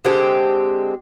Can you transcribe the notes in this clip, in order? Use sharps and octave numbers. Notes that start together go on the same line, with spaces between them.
D3 G#3 C4 G4